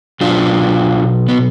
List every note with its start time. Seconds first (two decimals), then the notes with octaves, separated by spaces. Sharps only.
0.21 B2 F#3 D4 F4
1.28 B3